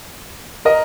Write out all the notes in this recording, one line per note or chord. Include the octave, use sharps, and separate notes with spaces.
A#4 D#5